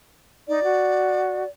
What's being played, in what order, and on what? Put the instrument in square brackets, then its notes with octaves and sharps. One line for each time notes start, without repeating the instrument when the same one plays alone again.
[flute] D#4 [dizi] D5
[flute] F#4